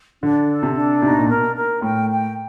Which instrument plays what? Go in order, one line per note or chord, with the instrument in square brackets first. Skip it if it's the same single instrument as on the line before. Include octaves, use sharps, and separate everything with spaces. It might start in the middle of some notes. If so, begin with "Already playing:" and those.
[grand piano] D3 [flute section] D4
[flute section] A4
[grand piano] C3
[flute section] D4
[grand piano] C3 [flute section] D#4
[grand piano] B2
A#2
[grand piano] B2 [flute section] A#4
[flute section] A#4
[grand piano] A2 [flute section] G5
[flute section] G5